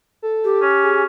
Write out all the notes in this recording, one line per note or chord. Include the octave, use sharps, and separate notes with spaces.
A4
G4
C#4
G#4